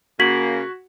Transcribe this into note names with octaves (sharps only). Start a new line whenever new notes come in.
C#3 A#3 F#4 G#6 B6 F#7